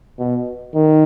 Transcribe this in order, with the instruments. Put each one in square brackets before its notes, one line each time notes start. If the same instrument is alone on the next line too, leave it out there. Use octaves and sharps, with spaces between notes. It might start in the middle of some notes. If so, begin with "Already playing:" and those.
[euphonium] B2
D#3